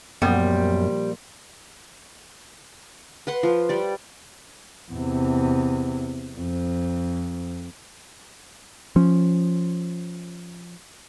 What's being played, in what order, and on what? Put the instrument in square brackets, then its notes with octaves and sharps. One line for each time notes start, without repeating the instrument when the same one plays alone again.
[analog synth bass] F#2 [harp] A#2 F3 [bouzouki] G3 [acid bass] B3
[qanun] B4 F#5 C6
F3
G3 D5
[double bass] E2 C3
F2
[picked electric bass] F3 C#4